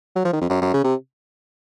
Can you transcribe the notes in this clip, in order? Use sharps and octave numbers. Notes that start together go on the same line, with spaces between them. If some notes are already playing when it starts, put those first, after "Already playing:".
F#3
F3
D#3
F2
F#2
F#2
C#3
C3